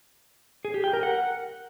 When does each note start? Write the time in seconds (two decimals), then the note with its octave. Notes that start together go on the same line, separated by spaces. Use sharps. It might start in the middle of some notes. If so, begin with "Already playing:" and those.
0.65 G#4
0.74 G4
0.84 G5
0.93 A#4
1.03 F#5